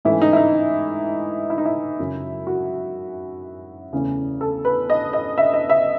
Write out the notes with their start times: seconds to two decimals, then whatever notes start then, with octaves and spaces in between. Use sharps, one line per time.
0.05 G#2 E3 A3 C#4 E4
0.22 D#4
0.33 E4
0.37 D#4
1.50 E4
1.58 D#4
1.65 E4
1.99 F#2 C#3 F#3 C#4
2.47 F#4
3.93 E2 C#3 E3 A3 C#4
4.41 A4
4.65 B4
4.90 D#5
5.13 D#5
5.38 E5
5.54 D#5
5.70 E5